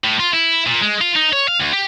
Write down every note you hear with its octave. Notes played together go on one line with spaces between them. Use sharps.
A2
F4
E4
A#2
G#3
F4
D#4
C#5
F5
D2
G4